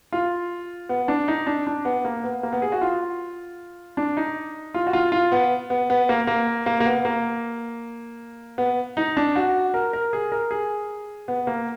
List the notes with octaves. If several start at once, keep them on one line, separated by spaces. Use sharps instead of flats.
F4
B3
D4
D#4
D4
D4
B3
A#3
B3
A#3
B3
G#4
F#4
F4
D4
D#4
F4
F#4
F4
F4
B3
B3
B3
A#3
A#3
A#3
A#3
B3
A#3
B3
D#4
D4
F#4
A#4
A#4
G#4
A#4
G#4
B3
A#3